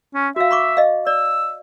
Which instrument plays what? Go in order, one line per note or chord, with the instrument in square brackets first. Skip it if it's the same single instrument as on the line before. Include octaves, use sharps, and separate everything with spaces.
[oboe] C#4
[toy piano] F#4 F5 [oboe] E5
[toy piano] B5 C#6 D6
D#5 F5
[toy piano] D5 [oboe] E6